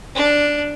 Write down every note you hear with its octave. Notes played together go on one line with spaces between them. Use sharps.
D4